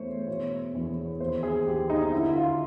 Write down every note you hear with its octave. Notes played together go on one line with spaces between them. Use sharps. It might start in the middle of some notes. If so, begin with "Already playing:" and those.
Already playing: E2 A3 C5 C#5
B2 C#5
E2
D#2 C5
G#4
D#2 G4
D#4
D3 E4
F4